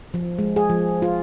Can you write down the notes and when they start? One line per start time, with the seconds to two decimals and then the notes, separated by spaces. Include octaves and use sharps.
0.14 F3
0.39 G#3
0.56 G#4
0.69 F3
1.02 F4